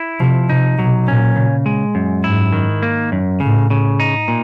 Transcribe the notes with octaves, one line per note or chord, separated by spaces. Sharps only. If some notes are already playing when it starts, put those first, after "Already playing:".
Already playing: E4
C3 F3
C3 D#4
B2 F#3
A#2 C#4
C#3
G#3
F#2
G#2 E4
D#3
A#3
F#2
A2 C#3
C#3
D#4
A#2